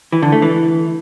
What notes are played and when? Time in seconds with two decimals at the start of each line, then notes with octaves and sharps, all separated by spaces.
0.12 E3
0.22 D3
0.32 A3
0.42 E3